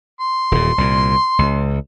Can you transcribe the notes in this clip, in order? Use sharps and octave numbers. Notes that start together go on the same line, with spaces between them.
C6
D#1 E2 A#2
C2 A#2
C#2